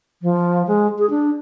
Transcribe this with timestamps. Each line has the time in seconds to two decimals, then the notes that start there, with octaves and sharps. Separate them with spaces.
0.22 F3
0.67 G#3
0.98 G#4
1.10 D4